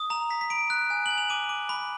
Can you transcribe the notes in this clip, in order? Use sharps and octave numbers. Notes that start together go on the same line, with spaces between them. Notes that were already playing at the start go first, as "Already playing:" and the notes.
Already playing: D#6
A#5 F7
A#5 B6
B6
B5 D7
F#6
G#5
F#7
G#5
F7
D6 D#7
D6
B5